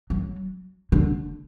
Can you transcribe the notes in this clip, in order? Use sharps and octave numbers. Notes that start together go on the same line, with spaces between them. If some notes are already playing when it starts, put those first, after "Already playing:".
F#3
D3